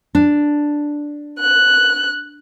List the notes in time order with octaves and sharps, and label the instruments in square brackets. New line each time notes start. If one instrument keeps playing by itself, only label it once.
[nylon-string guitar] D4
[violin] F#6